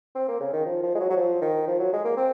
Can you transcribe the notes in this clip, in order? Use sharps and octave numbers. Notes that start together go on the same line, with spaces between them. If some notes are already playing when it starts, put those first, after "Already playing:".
C4
A#3
C#3
D#3
F3
F3
G#3
F#3
F#3
F3
D#3
F3
F#3
G#3
A#3
C4